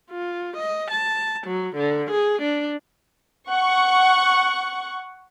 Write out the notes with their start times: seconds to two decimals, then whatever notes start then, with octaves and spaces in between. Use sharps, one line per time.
0.11 F4
0.57 D#5
0.91 A5
1.47 F#3
1.76 D3
2.11 G#4
2.42 D4
3.48 F#5 C#6